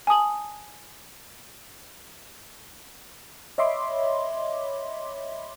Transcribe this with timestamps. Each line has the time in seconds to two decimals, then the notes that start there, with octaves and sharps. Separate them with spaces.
0.07 G#5 A5 D#6 F#7
3.58 C#5 D#5 E5 B5 C6 D6